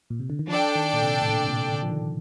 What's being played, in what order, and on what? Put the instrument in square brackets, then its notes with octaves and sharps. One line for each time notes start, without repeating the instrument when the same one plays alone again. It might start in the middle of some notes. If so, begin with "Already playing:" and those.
[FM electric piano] A#2
C3
D3
D#3
[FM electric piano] F3 [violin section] D4 A4 D5 G5
[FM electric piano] D#3
A#2
C3
A2
A#2
C3
A#2
D3
F3
D#3